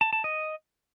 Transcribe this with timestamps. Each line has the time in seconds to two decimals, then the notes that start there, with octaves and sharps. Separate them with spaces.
0.01 A5
0.13 A5
0.24 D#5